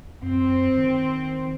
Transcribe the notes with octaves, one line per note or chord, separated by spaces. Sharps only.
F#2 C4
D#3